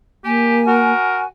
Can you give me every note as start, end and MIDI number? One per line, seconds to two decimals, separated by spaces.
0.25 0.93 58
0.25 0.60 67
0.25 1.25 80
0.67 1.24 66
0.67 1.20 70